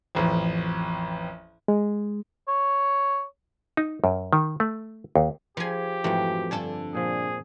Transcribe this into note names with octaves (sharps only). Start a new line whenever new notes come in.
A1 F2
G#3
C#5
D#4
F#2
D#3
A3
D#2
F3 G4 G#4 B4 G#5
F2 G#2 E3 A3 F#4
G2 D3 A4 G#5
A#2 F3 G#4